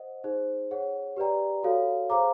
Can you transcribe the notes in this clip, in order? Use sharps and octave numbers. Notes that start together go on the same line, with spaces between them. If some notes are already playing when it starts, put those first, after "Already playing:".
Already playing: C5 D#5 F#5
D#4 G#4 C5
G#4 C#5 F#5
G4 B4 D5 G5 A#5
F#4 A4 C#5 F5
G#4 C5 F5 A#5 D6